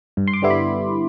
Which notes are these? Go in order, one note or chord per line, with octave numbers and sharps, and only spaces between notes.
G2
C6
D6
D3 G3 B3 E4
B5